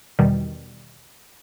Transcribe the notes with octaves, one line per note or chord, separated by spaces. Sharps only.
E2 B2 D#3 G3